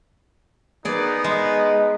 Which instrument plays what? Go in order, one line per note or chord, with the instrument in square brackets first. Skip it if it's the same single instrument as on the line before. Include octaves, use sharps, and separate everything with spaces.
[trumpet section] B3 D#4 [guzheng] G#4 D5
[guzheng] G#3